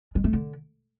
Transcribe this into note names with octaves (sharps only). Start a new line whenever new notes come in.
G#3
A3
D3